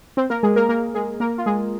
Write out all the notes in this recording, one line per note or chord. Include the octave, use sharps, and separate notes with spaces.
C4 C5
A#3 A#4
G#3 G#4
A#3 A#4
A#3 A#4
G#3 G#4
A#3 A#4
F4
G#3 G#4